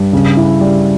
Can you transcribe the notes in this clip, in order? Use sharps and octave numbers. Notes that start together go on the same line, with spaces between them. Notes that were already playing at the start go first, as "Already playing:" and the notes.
Already playing: G2
C#3
E4
G3